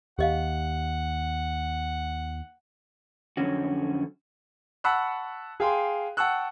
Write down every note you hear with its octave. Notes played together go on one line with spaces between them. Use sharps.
D#2 G4 D#5 F5 F#5
F2 D3 F#3 C#4 F#4
F#5 A5 B5 C#6 E6 F#6
G#4 F5 G5 G#5 C6
F#5 G5 A5 C#6 E6 F#6